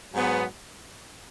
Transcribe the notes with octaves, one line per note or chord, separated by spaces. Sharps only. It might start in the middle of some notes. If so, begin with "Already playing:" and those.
G#2 F#3 B3